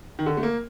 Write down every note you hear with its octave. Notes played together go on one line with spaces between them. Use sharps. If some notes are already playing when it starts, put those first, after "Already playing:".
D#3
D3
A3
A#3